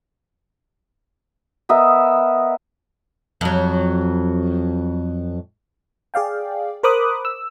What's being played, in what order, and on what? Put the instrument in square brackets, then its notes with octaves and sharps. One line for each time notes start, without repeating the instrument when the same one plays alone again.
[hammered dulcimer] B3 A#4 D#5 E5
[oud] F2 F#3
[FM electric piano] G#4 D5 F5 G5
A#4 C5 B5 D6 D#6 F#6
E6